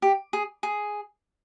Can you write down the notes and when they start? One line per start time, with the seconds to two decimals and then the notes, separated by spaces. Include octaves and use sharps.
0.02 G4
0.33 G#4
0.63 G#4